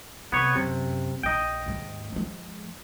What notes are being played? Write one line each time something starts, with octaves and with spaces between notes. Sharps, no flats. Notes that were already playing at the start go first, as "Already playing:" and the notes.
C3 B3 C#5
F#2 C3
A#1 D#5 G5
D#2 G#2
F3 G#3